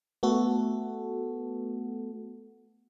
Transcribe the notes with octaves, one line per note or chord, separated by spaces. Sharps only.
A3 B3 F#4 A4